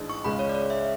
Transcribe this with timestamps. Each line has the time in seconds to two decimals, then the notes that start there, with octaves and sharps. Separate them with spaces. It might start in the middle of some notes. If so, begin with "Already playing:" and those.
Already playing: A1 G#2 G#3 D4
0.10 C#6
0.24 C#2 C#3 G#3 B5
0.39 C#5
0.49 D5
0.55 C#5
0.70 E5